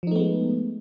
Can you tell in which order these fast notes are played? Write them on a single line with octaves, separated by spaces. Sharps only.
F3 D#4 A3 B3 G#3